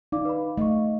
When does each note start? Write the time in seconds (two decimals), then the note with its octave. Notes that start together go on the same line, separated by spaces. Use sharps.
0.12 D#4 D5 F5 D6
0.25 B4 F5 B5
0.58 A3 D#5 F5 C#6